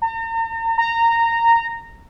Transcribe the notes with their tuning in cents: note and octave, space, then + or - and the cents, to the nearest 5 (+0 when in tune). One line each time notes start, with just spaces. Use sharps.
A#5 -45
A#5 -15